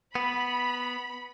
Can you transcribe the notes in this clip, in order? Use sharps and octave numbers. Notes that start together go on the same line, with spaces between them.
B3 B5